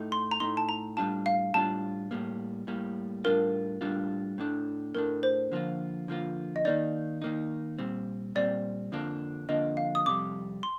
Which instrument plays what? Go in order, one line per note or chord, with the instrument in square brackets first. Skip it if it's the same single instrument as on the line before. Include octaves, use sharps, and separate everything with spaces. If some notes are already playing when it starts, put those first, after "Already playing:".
Already playing: [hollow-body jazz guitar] A2 A3 D#4
[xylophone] C6
A#5
[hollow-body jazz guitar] A2 A3 D#4 [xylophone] C6
[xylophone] A5
A#5
[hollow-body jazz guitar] A2 G3 D4 F4 [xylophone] A5
[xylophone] F5
[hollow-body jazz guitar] A2 G3 D4 F4 [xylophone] A5
[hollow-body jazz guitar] A2 G3 A#3
A2 G3 A#3
[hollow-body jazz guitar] A2 G3 D4 F4 [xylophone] A#4
[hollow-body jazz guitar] A2 G3 D4 F4
A2 A3 D4
[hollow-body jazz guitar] A2 A3 D4 [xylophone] A#4
[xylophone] C5
[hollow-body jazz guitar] D3 F3 A#3 F4
D3 F3 A#3 F4
[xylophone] D#5
[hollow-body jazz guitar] D#3 A#3 D#4 [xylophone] D5
[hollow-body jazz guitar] D#3 A#3 D#4
A#2 G3 C4
[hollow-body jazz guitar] A#2 G3 C4 [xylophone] D5
[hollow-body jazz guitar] F2 D3 F3 A#3 D4
[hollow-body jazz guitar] F2 D3 F3 A#3 D4 [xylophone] D#5
[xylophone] F5
D#6
[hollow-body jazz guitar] F2 C3 G3 [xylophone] D6
[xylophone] C6